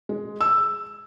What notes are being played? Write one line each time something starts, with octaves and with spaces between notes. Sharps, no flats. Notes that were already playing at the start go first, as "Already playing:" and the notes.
G#3
E6